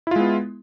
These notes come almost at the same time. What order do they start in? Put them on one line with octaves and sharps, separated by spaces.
E4 F4 G#3 B3